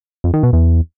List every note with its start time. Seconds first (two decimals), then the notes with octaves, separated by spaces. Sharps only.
0.24 F2
0.34 D#3
0.43 B2
0.53 E2